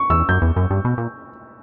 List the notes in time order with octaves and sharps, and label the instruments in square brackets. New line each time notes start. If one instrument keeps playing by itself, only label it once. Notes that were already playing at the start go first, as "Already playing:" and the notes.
Already playing: [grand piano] C#6
[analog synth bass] E2 [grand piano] E6
[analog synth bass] F#2 [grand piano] G6
[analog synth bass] E2
F#2
G2
B2
A#2